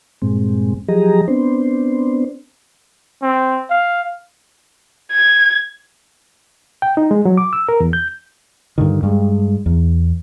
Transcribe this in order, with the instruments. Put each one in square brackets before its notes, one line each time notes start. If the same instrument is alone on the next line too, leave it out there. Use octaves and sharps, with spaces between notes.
[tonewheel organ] G2 A#2 G#3 C4
F3 F#3 G4 G#4 D#5 A#5
B3 C4 D4 C5
[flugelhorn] C4
F5
[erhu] G#6
[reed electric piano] G5
D#4
G#3
F#3
D6
E6
A#4
E2
G6
[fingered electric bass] G2 D3 D#3
G2 G#3
E2